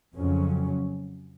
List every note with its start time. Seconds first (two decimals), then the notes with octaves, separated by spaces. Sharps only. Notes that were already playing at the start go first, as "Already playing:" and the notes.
0.17 F2 C#3 F#3 C#4